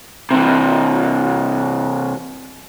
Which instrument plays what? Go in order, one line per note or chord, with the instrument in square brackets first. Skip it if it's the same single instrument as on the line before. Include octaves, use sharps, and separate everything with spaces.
[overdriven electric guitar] C3 E3